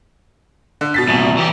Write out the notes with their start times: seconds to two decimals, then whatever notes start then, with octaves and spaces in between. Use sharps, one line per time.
0.81 D3
0.94 B2 A6 B6
1.08 C2 A#2
1.37 E3 G4